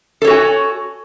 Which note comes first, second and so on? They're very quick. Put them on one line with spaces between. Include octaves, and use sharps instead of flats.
A4 C#5 F#4 G#5